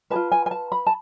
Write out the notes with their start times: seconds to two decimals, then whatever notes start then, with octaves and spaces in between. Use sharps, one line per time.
0.10 G#4 B4 A5
0.16 F4
0.32 G#5
0.46 G#5
0.51 A5
0.72 B5
0.86 A5